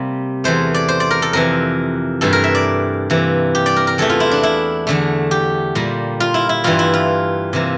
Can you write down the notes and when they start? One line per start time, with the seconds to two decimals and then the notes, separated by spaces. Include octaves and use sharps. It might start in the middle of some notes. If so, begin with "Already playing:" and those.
Already playing: C3 G3 A#3
0.44 E2 E3 A3 C5
0.74 D5
0.88 C5
1.00 D5
1.10 A#4
1.22 A4
1.33 F2 C3 E3 A#4
2.21 G2 E3 A3 A4
2.33 A#4
2.44 E5
2.55 D5
3.10 C3 E3 A#3
3.55 G4
3.66 D5
3.76 A#4
3.87 A#4
3.98 E2 E3 A3 A4
4.10 F4
4.20 E4
4.31 D4
4.43 E4
4.87 E2 D3 A3
5.31 G4
5.75 A#2 G3 A#3
6.20 F4
6.34 E4
6.49 E4
6.64 G2 E3 G3 A#3 F4
6.79 E4
6.94 F4
7.53 C3 E3 A#3